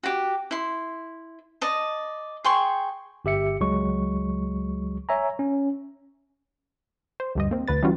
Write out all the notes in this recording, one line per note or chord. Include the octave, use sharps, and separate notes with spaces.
F#4 G4
E4 C6
D5 D#5 A5
G#4 G5 C6 C#6
G1 G4 E5 C#7
C#2 F#3 G#3 C#6
C#5 E5 G#5 A#5
C#4
C5
D2 G2 D#5
A#3 C4
D2 B4 A6
E3 G3 C#4 F4 F#4